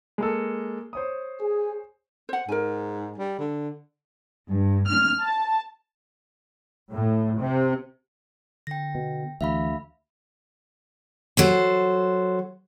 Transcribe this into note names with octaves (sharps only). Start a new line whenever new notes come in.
G#3 A#3 A4
C5 C#5 D#6
G#4
C5 F#5
G#2 A#4 G#5
G3
D3
G2
F6
A5
A2
C3
D3 G5 A#6
B2
D2 E3 E5 F5 B5
F#3 A4 C5